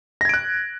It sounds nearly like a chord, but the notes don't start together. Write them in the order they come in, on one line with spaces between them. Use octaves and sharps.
A#6 G#6 D7 F#6